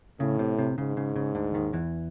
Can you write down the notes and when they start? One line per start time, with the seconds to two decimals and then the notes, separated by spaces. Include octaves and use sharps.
0.20 A2 C#3
0.39 C3
0.58 C3
0.77 G#2 C#3
0.97 C#3
1.16 C#3
1.35 D2 D3
1.54 D#2 D#3
1.73 E2 E3